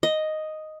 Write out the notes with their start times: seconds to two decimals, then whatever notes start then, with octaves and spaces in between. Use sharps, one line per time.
0.03 D#5